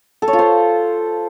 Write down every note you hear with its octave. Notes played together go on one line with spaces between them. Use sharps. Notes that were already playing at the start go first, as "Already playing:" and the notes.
A4
C#5
F4
C5